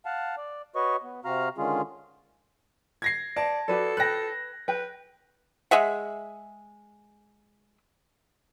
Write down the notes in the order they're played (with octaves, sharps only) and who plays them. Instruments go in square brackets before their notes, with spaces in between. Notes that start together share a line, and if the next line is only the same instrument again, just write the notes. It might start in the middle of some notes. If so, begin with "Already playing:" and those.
[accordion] F5 F#5 A5
D5
F#4 B4 C#5 D#5 C#6
B3
C3 C4 F#4 F5 A#5 F6
D3 D#3 G#3 C#4 F4 G#4
[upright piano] G#6 A#6 C7
[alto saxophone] D5 [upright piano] A5
[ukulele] F#4 B4 D5 [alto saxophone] A4
[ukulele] B4 G5 [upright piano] F#6 A#6
[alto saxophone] B4 [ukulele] G5
[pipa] G#3 G#4 E5 F#5